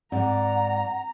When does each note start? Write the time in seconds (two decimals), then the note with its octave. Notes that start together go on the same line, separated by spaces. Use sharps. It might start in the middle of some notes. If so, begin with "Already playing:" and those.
0.12 G#2 C4 D5 F#5 A#5